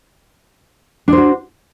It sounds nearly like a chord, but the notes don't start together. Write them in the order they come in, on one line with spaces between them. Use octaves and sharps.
D4 C5 F#4